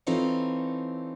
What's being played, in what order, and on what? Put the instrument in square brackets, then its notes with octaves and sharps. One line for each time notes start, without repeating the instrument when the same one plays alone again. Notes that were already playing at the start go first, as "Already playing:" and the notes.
[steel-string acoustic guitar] E3 C4 D#4 F4 A4 C#5